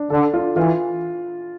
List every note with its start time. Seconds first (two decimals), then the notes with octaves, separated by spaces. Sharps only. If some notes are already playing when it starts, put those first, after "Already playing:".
Already playing: D4
0.10 D3 A4
0.34 F4
0.56 E3 F4